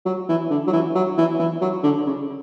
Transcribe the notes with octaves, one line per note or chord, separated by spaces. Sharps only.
F#3
E3
D3
F#3
E3
F#3
E3
E3
F#3
D3
C#3